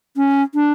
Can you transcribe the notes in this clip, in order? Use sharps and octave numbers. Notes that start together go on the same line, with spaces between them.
C#4
D4